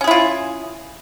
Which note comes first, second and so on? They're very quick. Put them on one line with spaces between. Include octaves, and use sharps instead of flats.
C#4 G#4 E4 F4